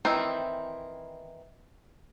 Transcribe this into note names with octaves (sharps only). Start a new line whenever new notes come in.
D#3 E3 C4 E4